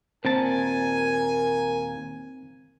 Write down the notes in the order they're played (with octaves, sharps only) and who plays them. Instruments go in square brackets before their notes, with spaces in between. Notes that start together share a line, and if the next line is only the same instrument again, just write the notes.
[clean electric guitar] D#2 A#2 A5 [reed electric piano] C4 [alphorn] A#4 [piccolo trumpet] G#5